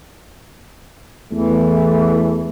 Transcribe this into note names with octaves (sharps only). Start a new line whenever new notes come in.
E2 E3 A3